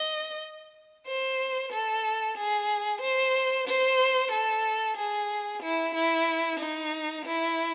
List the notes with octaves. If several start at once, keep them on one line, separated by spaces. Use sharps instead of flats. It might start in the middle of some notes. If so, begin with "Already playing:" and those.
Already playing: D#5
C5
A4
G#4
C5
C5
A4
G#4
E4
E4
D#4
E4